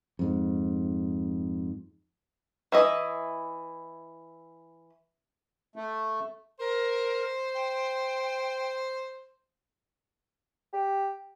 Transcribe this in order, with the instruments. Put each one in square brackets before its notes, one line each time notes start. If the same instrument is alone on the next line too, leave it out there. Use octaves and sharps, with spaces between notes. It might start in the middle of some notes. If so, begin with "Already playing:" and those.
[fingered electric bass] F2 G#2
[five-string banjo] E3 E4 D#5
[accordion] A3
[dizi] A#4 [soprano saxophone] C5
[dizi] G5
[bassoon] G4